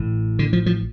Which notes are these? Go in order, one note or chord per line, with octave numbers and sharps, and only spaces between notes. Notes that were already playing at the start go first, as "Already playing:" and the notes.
Already playing: A1 A2
D3
F3
F3